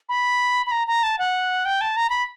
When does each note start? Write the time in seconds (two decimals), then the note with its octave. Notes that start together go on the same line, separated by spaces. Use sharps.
0.09 B5
0.66 B5
0.72 A#5
0.88 A#5
1.03 A5
1.19 F#5
1.65 G5
1.81 A5
1.97 A#5
2.10 B5